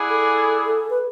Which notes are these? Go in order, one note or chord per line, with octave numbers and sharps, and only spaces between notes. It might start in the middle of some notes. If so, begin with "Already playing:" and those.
Already playing: E4 G#4 D5 F#5
A4
B4